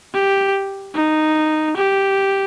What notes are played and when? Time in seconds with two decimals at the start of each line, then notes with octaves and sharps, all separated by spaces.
0.14 G4
0.95 D#4
1.77 G4